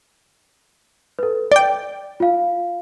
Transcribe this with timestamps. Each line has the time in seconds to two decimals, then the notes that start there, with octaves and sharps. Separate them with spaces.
1.19 A4 B4
1.52 D5 G5 G7
2.20 F4 F5